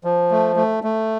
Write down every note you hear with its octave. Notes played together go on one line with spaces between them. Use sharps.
F3
A3
A3
A3